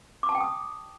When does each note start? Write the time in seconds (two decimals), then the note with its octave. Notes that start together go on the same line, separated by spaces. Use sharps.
0.23 D6
0.29 A5
0.35 G5
0.41 D#6